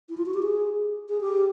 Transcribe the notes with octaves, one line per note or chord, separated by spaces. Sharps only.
E4
F4
F#4
G4
G#4
G#4
G4